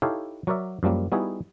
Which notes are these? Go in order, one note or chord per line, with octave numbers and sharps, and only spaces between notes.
D#4 E4 G4 A4 C#5 F5
F#3 F#4 A#4 D5 E5
F#2 F3 G3 A#3
G3 B3 D#4 E4 F#4 G#4